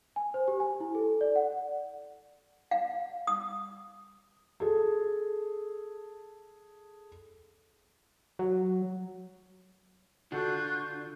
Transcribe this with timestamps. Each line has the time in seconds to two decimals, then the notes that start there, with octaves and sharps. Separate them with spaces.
0.16 G#5
0.34 C5
0.48 G4
0.60 G#5
0.80 E4
0.95 A4
1.21 D5
1.35 F#5
2.71 F5
3.27 D#6
4.60 G#4 A4
8.39 F#3
10.32 D3 D4 F4 F#4 A4 C#6 F#6 G6